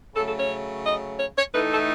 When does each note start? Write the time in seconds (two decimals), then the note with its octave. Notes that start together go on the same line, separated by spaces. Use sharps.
0.15 C#3 F#3 A3 A4
0.27 A4
0.38 C#5
0.85 D#5
1.19 C#5
1.37 C#5
1.53 A2 E3 A3 D#4 B4
1.72 A4